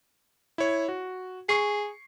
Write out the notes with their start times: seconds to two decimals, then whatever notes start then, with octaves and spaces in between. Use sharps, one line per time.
0.58 E4 C#5
0.88 F#4
1.49 G#4 C#6 C7